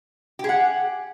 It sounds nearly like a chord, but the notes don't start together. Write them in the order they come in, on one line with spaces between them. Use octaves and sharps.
G4 G#4 F#5